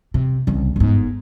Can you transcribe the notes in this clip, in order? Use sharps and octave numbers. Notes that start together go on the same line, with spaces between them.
C3
C2 C#3
G1 G#2